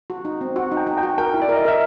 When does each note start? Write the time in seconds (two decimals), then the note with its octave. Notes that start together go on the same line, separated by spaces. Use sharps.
0.10 F#4
0.25 D#4
0.41 C4
0.56 F#4 F#5
0.72 D#4
0.77 G5
0.87 D#4
0.98 G5
1.03 F#4
1.18 A#4 G5
1.34 E4
1.42 D5
1.49 A#4
1.55 D#5
1.65 A#4 E5